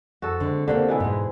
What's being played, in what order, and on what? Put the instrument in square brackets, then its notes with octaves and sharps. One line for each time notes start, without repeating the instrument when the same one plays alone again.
[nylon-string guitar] F2 [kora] F#4 A4
[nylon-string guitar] D3 G#3 C4
[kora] D3 [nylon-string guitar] A#3 C4 G4
[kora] B2 E3 E4
[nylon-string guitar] G#2 G#3